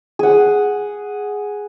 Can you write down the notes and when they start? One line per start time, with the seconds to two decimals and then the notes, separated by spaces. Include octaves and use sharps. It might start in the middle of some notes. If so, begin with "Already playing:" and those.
0.19 G#4 F#5